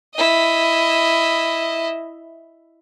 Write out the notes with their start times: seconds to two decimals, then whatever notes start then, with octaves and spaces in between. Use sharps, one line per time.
0.15 E4 D#5